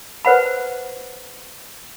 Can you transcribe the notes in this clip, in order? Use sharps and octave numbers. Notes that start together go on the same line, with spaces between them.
B4 C5 F#5 B5